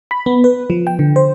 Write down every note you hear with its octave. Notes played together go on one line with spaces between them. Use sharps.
B5
B3
B4
F3
G5
D3
C5